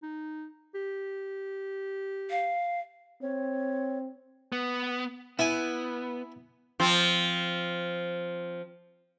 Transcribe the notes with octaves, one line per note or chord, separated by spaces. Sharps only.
D#4
G4
F5
C4 C#5
B3
B3 E4 G#5
F3 C4